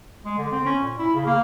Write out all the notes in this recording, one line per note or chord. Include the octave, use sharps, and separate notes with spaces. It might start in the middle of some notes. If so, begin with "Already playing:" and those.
G#3
D3
C4
C#4
A#2
E4
C#3
A#3